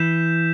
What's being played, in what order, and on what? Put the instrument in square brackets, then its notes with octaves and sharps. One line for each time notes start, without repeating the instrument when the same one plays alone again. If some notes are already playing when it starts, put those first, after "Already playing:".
Already playing: [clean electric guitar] E3 [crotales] G6 B6 E7